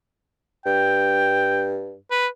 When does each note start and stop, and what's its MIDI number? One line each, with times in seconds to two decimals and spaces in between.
0.66 1.97 43
0.66 1.70 79
2.11 2.27 71